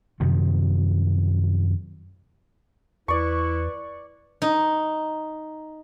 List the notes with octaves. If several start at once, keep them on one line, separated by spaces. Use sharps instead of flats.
F#2 C3 D#3 F3
E2 E4 B4 D5 C#6
D#4